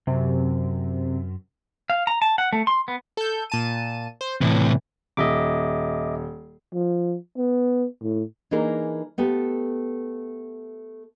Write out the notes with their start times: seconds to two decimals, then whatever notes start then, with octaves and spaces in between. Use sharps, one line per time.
0.07 F#2 C3
1.90 F5
2.07 A#5
2.22 A5
2.38 F#5
2.53 A3
2.67 C6
2.88 B3
3.17 A4 G6
3.50 A#2 A5 D#7
4.21 C5
4.41 A2 C3 E3
5.17 D#1 D#5 E5 D6
6.73 F3
7.38 B3
8.02 A2
8.51 E3 A#3 D4 D#4 G#4 A#4
9.18 A3 B3 G4 A4